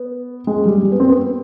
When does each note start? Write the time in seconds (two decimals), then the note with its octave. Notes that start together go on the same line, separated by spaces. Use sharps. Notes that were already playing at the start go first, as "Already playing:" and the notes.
Already playing: B3
0.47 G#3
0.66 G3
0.83 G3
0.91 B3
1.00 C4
1.08 B3